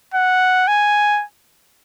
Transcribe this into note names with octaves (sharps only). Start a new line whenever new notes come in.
F#5
G#5